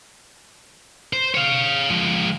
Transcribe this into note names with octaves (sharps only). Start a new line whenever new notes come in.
C5
C#5 F5
F3 G#3